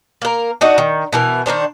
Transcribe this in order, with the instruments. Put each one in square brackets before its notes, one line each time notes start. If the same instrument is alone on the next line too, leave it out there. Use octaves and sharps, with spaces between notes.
[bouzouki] A#3 A#4
D4 D#4 F#4
D#3
B2 E3 A#4
D#3 B3 D4 C5